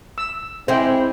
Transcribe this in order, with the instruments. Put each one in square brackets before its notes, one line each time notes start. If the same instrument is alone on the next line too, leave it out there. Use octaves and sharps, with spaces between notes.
[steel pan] E6
[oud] G#3 E4 [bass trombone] C4 [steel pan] C5 G5